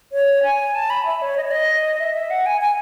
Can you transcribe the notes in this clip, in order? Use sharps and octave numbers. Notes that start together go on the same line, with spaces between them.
C#5
G#5
A5
B5
E5
C#5
D#5
C#5
D#5
E5
E5
F#5
G#5
G#5